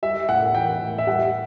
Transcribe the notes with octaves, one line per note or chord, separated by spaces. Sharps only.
G3 E5
A2 F#5
E3 G5
A2
E5
G3 F#5